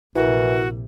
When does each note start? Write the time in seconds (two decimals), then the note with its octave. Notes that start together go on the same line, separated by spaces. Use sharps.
0.15 A#1 C3 E3 E4 F#4 A#4